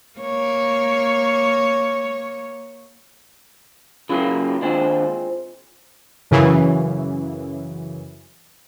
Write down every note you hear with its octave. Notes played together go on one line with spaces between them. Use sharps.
A#3 C#5
C#3 F#3 A#3 E4 F4 B4
D#2 G#3 C4 D4 F4 C5
F#2 C#3 E3